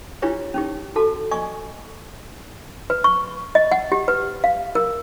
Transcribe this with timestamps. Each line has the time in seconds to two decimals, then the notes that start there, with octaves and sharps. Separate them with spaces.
0.22 D4 E4 F4 G4 B4 C#5
0.54 C#4 D#4 G4
0.96 F#4 A4 A5
1.31 D5 D#5 G#5 C#6
2.90 B4
3.04 C#6
3.55 D#5
3.71 F#5
3.92 G4
4.08 B4
4.44 F5
4.75 A#4